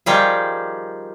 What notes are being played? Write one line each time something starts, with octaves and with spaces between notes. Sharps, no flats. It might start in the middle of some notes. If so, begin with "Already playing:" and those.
D#3 F3 G3 D#4 G#4